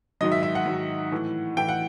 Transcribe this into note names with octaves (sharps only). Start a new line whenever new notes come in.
G#2 D#3 F#3 D#5
E5
E5
F#5
G#2 D#3 F#3
A2 E3
A2 E3 G5
F#5